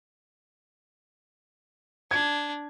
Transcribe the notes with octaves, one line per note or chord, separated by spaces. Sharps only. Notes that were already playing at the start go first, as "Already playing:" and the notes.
D4 G#6